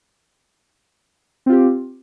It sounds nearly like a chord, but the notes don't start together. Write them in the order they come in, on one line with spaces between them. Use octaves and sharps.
C4 F4 G4